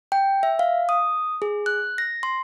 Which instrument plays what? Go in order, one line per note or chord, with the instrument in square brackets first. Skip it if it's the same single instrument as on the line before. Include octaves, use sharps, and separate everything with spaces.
[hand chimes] G5
E5
F5
D#6
G#4
F#6
A#6
C6